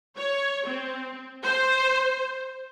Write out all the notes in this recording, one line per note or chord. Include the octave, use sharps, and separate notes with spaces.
C#5
C4
C5